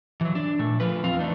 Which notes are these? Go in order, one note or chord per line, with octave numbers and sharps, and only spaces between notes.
E3 F#3
D4
A#2 A3
F3 F4 B4
E2 F3 C4 F4 F5
E3 A3 D4 D#4